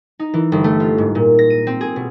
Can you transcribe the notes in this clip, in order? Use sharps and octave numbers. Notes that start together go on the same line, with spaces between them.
D#4
E3
G1
A3
F4
G#2
A#2
A#6
D#7
C4
G#4
B2